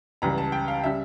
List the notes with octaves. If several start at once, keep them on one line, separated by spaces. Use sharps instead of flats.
C#2 C#3 E3 G3 A#5
A5
G5
F5
C#3 G3 E5